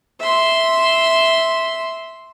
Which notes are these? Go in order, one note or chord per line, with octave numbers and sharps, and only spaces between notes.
E5 C6